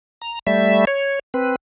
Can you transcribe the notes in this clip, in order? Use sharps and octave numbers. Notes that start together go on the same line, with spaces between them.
A#5
G3 A3 E5
C#5
C4 B4